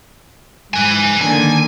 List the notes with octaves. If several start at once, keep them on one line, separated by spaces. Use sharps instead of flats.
G#2 B4 G#5
D3 D#3 A#3 G#5